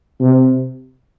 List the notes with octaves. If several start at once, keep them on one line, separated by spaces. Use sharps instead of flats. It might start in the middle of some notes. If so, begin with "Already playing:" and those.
C3